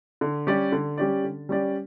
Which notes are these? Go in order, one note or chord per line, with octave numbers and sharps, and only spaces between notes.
D3
G3 C#4 G4 D5
D3
G3 C#4 G4 D5
D3
G3 C#4 G4 D5